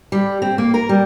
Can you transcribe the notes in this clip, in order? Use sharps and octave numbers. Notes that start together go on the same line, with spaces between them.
G3
C4
A#3
A#4
G3